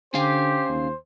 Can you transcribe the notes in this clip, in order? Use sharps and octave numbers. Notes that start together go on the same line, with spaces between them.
D3 C#4 G4 C5 F5 G#5
D#2